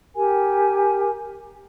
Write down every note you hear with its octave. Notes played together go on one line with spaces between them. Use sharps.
G4 A#4 G#5